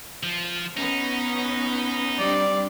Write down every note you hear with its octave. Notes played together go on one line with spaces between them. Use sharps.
F3
B3 C#4 D#4
G3 C4 D4 D5